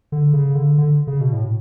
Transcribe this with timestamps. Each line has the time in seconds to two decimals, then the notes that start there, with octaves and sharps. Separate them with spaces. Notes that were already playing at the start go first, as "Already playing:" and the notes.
0.12 D3
0.33 C#3
0.55 D3
0.78 D3
1.07 C#3
1.21 B2
1.33 A2